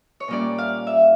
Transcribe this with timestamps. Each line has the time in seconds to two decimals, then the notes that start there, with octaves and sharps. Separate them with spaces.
0.20 C#5
0.28 A#2 G3 A#3 C#4 D5
0.58 F5
0.87 E5